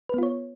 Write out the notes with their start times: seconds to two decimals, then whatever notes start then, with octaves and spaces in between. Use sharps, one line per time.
0.09 B4
0.14 B3
0.18 F4
0.23 C#5